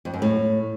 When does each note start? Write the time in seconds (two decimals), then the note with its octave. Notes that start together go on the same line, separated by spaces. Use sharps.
0.05 F2
0.14 F#2
0.22 A2